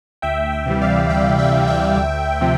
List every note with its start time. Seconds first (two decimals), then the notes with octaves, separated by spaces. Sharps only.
0.22 D2 E5 G5
0.52 E5 G5
0.66 C3 E3 G3
0.82 D5 F5
1.09 D2 E5 G5
1.39 E5 G5
1.54 C3 E3 G3
1.68 E5 G5
1.97 D2
2.41 C3 F3